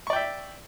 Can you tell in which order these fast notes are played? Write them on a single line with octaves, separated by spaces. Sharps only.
C#6 D5 G5 E5